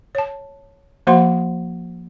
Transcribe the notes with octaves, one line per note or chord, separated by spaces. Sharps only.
C#5 A5
F3 A#3 F#4 C5 F#5 C6